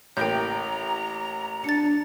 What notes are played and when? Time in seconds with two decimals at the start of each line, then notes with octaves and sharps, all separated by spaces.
0.17 A1 A#3 G5 A#5 G6
1.64 D4 A6 C#7